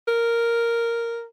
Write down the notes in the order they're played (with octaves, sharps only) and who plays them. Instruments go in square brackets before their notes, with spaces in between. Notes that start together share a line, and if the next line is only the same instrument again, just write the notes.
[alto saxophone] A#4